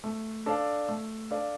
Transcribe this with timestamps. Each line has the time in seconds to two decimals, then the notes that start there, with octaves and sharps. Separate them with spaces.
0.04 A3
0.46 D4 A4 D5 F5
0.89 A3
1.31 D4 A4 D5 F5